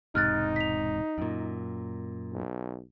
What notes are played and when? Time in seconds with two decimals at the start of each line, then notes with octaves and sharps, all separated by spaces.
0.15 E1 G#2 C3 D#4 F6 F#6 A6
0.56 B6 F7
1.18 F#2 A#2
2.33 B1